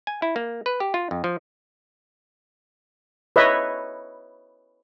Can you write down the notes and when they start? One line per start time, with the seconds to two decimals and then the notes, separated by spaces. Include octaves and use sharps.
0.07 G#5
0.22 E4
0.36 A#3
0.66 B4
0.80 G4
0.94 F4
1.11 F2
1.24 F3
3.36 B4 C#5 D#5 E5